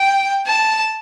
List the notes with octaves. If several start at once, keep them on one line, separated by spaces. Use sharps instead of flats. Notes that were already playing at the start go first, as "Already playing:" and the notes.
Already playing: G5
A5